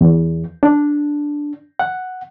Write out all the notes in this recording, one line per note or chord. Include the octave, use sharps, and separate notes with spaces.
E2
D4
F#5